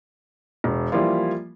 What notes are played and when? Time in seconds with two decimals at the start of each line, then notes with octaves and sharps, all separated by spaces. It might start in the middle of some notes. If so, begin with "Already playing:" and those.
0.64 E1
0.92 E3 F3 G3 A#3 E4 F4